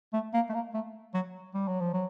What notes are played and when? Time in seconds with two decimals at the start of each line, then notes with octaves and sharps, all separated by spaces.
0.13 A3
0.34 A#3
0.49 A3
0.54 A#3
0.74 A3
1.14 F#3
1.54 G3
1.68 F#3
1.81 F3
1.93 F#3